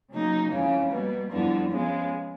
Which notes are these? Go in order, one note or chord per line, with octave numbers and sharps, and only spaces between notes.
C#3 F#3 A#3 D#4
F2 C#3 E3 G#3
B2 G3 A#3
F2 D3 G3 B3 E4
C#3 F3 G#3 B3